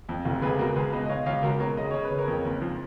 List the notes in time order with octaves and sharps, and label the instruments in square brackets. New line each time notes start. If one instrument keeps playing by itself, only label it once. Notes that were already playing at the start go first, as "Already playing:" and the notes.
[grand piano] F2
F1
C#2 G#4 B4
B2 F#4 A#4
C#2 G#4 B4
B2 B4 D#5
D#5
B2 C#5 F5
C#2 C#5 F5
C#2 F#4 A#4
B2 A#4 C#5
C#3 D#5
C#3 C#5
B4
C#3
A#4 C#5
F2
F#1
F3